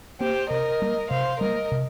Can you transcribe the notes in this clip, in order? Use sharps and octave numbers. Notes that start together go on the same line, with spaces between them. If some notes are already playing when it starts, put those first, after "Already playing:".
A#3 G4 C5
C3 A#4 D#5
G3 A#3
C3 C5 F5
G3 A#3 A#4 D#5
C3